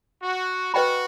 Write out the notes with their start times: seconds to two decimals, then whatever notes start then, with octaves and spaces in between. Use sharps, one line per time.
0.22 F#4
0.73 F#4 B4 D#5 G5 B5